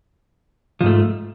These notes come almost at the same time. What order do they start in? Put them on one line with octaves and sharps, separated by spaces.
F3 G#2 A3